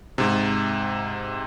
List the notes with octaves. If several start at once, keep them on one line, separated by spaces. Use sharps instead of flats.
G#2 C3